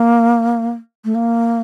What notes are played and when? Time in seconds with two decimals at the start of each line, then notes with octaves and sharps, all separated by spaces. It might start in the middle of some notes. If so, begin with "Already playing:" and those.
Already playing: A#3
1.05 A3
1.15 A#3